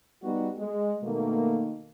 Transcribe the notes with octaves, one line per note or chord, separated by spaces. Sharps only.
G3 B3 D#4 F#4
G#3
B2 D#3 A3 A#3